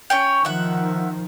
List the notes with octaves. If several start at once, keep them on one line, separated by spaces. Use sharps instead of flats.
C#4 C#5 G5
D#3 F3 E5 F#5